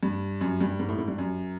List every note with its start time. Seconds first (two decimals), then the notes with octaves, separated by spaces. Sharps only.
0.03 G2
0.41 F#2
0.61 G2
0.79 G#2
0.89 A2
0.98 G#2
1.08 G2
1.18 F#2